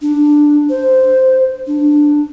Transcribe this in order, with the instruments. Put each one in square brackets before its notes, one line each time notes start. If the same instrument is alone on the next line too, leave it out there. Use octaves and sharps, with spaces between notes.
[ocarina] D4
C5
D4